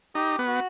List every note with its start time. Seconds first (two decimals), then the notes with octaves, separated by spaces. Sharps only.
0.15 D#4 G4
0.39 B3
0.48 F#4